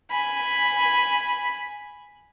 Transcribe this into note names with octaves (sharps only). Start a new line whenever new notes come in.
G#5 B5